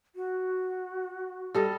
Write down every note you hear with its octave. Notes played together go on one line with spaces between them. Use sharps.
F#4
G3 A4 D#5